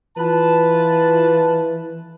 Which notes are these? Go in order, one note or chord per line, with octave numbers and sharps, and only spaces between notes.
E3 F4 B4 A5